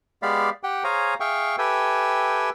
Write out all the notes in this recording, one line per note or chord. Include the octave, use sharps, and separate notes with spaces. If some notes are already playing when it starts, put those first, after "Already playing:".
G#3 B3 G4 D5 F5 B5
G4 F#5 G5
G#4 C5 C#5 F5 G#5 A#5
G#4 E5 F5 G5 C#6
G4 A4 B4 E5 G5 G#5